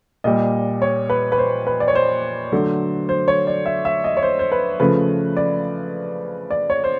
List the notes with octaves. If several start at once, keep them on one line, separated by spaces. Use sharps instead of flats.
A#2 G3 D#5
C#5
B4
B4
C5
B4
D5
C#5
C5
D3 F#3 A3
C5
C#5
D5
E5
E5
D#5
C#5
C5
C5
B4
C#3 F3 A3 B4
D5
D5
C#5
C5